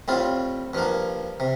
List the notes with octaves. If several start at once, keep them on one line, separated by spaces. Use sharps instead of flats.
A2 G3 C4 F4
G2 F3 A#3
C3